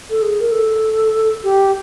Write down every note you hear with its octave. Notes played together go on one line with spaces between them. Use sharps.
A4
G#4
A#4
A4
G4